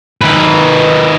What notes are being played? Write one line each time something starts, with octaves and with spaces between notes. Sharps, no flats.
D#3 B4